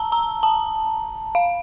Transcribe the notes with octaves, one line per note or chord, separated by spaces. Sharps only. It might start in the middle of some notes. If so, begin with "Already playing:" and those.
Already playing: A5 A#5
A#5
A5
F5